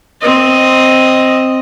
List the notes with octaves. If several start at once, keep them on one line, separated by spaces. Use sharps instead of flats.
C4 D#5